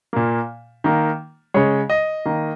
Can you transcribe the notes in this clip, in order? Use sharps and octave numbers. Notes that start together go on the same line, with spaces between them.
A#2 A#3
D#3 A#3
C#3 G#3 C#5
D#5
D#3 A#3